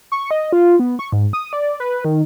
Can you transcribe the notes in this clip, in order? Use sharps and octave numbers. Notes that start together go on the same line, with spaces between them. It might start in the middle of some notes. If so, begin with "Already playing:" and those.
C#6
D#5
F4
B3
C#6
G#2
D#6
D5
B4
D#3